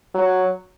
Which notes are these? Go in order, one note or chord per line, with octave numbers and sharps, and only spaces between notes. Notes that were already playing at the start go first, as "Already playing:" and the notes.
F#3